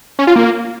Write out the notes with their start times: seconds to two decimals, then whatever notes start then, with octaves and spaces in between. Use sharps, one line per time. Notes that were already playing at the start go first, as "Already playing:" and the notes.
0.19 C#4
0.27 F4
0.36 A#3